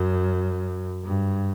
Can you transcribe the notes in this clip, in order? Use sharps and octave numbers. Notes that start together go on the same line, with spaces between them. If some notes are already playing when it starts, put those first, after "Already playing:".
Already playing: F#2
G2